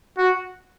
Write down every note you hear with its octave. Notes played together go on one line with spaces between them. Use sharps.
F#4